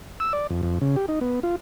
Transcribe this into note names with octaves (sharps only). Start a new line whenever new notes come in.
E6
D5
F2
F2
C#3
G4
D#4
B3
F4